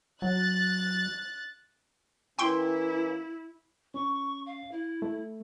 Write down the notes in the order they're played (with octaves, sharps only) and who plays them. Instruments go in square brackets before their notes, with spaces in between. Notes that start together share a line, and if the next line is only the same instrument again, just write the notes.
[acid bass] F#3 [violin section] F#6 A6
[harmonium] E3 A#3 C#4 [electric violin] E4 [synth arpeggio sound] G5 C6
[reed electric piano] C#4 [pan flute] C#6
[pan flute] F5
E4
[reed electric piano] A3